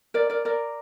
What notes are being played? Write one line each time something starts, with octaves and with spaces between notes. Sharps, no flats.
A#4 D5
A#4 D5
A#4 D5